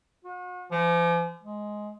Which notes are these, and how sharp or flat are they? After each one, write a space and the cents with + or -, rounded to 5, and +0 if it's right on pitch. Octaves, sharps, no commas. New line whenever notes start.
F#4 -40
F3 -40
G#3 +10